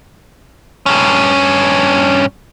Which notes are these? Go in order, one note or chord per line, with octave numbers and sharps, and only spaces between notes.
G2 C#4